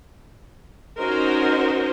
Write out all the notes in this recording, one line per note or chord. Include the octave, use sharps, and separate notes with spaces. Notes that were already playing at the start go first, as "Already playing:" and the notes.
C#4 D#4 F#4 A#4 C5 D#5